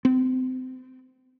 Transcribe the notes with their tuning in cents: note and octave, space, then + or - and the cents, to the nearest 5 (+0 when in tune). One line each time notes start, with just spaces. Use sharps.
C4 -30